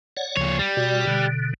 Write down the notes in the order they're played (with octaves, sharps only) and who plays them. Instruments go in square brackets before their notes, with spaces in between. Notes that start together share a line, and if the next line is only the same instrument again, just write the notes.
[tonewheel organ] C#5 D5 F#5
[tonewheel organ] D2 C#3 F3 [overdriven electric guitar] A#2 C#5
[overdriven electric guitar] G3
[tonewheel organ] B2 F#4 D5
B2 D3